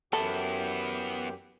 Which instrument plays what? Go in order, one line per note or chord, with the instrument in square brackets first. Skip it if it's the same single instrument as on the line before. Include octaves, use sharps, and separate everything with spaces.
[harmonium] F#2 G4 G5 [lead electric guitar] B3 E4 [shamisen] A4